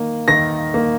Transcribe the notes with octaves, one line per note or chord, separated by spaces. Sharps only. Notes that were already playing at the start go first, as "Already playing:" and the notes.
Already playing: D#3 A#3
D#3 A#6
A#3